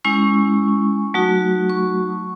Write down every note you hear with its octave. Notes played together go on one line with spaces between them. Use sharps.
G#3 C#4 E4 C#6
F#3 A3 D#4 F#4
C#6